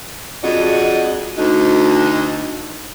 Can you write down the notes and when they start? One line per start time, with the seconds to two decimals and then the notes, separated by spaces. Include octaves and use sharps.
0.43 F2 G#3 D4 F#4 D#5
1.38 D2 D#4